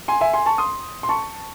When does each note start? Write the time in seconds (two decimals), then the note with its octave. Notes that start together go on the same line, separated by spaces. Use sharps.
0.08 G#5 C6
0.21 E5 G#5
0.33 G#5 C6
0.46 A5 C#6
0.58 C6 D#6
1.03 C6
1.09 A5 C#6